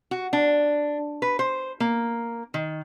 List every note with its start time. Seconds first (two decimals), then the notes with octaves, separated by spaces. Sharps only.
0.11 F#4
0.33 D4
1.22 B4
1.39 C5
1.80 A#3
2.54 D#3